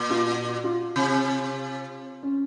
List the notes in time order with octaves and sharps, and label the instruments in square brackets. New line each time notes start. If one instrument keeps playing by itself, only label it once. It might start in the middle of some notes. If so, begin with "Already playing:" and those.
Already playing: [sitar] A#2
[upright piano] F4
F#4
F4
[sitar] C3
[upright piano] C#4